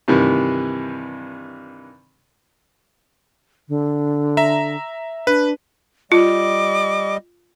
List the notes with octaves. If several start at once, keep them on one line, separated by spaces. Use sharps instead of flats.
G2 C3 D#3 E3
D3
E5 A#5
D4 B4
G3 F4 D#5 D6